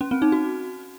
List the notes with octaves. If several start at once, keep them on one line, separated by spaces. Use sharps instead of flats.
C#4
C4
D#4
F#4